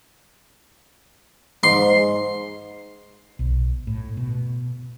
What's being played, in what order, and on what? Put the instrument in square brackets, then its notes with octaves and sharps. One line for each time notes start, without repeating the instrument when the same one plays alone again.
[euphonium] G#2 [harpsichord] C6
[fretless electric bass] B1
A2
B2